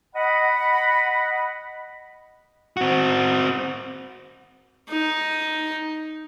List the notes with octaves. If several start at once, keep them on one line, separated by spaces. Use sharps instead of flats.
D#5 F#5 B5
C4 F#4
D#4